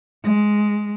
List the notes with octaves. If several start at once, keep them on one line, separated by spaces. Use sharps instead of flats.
G#3